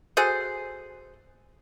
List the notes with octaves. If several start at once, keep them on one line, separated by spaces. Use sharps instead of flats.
F#4 G#4 A4 C5